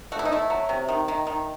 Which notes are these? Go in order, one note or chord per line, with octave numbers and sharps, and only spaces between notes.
A3 F#4
E4
D#4
A3 E4
F#3
C3
D#3
D#3
D#3